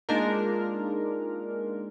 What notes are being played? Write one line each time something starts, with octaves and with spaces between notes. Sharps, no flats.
G#3 A#3 D4 D#4 F4 A#4